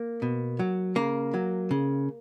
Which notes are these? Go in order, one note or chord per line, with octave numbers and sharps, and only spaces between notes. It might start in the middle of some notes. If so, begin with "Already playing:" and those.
Already playing: A#3
B2
F#3
C#3 A#3
F#3
C#3